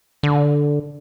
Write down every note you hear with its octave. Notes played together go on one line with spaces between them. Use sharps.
D3